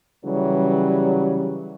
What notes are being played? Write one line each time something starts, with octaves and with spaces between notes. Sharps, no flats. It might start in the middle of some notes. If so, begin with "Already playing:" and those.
C#3 E3 F#3 G3